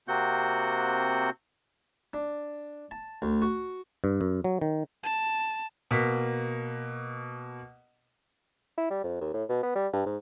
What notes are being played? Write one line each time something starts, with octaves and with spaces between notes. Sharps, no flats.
C3 A#3 C4 F#4 F#5 G6
D4
A5
D2
F#4
G2
F#2
F#3
D#3
A5
B2 A#3 B6
E4
G3
F2
D#2
A2
B2
B3
G3
G2
G#2